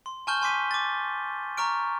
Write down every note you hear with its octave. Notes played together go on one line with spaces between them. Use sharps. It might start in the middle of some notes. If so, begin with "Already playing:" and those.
C6
G#5 A5 C#6 F6 G6 G7
G#5 C6 D6 B6 D#7
D6 A6
A#5 C#6 F6 D7